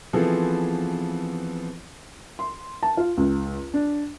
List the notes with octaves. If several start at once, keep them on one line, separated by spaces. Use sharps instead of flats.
E3 F3 B3 C4 G#4 A4
C6
A5
F4
C#2
D4